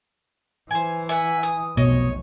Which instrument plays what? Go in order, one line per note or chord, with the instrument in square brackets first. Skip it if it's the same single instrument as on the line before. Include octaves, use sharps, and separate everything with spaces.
[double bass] E3 [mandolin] C5 G#5
[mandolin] E5 F#5 [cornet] G#5
[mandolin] D#6
[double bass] F1 B1 [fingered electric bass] B2 [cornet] C#5 [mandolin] D#5